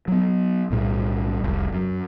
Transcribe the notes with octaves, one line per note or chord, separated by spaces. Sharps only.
F#3 B3
B1 A2 G3
F1 C2
F#2